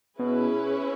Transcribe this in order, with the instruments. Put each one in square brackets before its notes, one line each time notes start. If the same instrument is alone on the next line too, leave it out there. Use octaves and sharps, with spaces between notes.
[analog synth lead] B2 [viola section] C#4 E4 G#4 B4